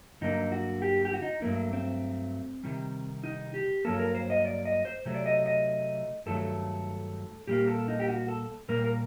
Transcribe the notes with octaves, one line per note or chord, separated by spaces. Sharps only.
G2 D3 F#3 A#3 D#4
F#4
G4
G4
F#4
D#4
G2 F#3 A3 A#3
C4
C3 D#3 G3
D#4
G4
G2 F#3 A#3 A4
A#4
C5
D#5
D5
D#5
C5
C3 F#3 A3
D5
D#5
D#5
G2 D#3 F#3 A3 A4
A#2 G3 A#3 G4
A4
D#4
G4
F#4
A4
A#2 G3 A#3 A#4
A#4